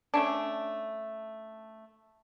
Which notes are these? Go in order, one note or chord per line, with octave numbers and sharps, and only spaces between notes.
A3 C#4 D4